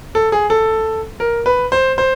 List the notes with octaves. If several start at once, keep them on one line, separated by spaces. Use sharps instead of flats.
A4
G#4
A4
A#4
B4
C5
C5